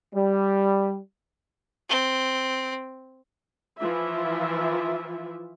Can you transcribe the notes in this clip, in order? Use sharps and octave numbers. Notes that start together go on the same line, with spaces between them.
G3
C4
E3 F3 E4 F4 E5